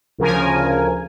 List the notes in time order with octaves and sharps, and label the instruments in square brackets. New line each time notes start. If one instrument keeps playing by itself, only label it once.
[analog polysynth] D2 C#3 F3 A#4 G#5